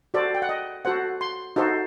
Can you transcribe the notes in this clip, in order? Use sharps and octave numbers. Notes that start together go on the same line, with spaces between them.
F#4 A4 C5 D5
G5
F#5
D#5
F#4 A4 C5 F#5
C6
D#4 F#4 A4 C5